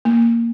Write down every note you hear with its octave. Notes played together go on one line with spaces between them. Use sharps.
A#3